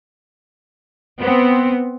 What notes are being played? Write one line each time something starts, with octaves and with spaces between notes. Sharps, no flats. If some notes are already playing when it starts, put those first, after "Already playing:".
B3 C4